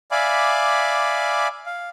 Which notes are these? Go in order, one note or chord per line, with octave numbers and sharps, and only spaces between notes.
D5 E5 F5 G#5 B5 D6
F5